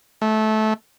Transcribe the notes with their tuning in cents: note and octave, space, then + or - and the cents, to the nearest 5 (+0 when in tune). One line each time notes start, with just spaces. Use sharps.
A3 -20